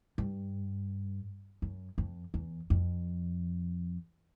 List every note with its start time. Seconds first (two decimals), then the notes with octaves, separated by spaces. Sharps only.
0.18 G2
1.62 F#2
1.98 F2
2.34 E2
2.70 F2